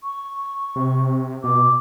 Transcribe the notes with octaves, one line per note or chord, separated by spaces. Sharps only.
C#6
C3
B2 D6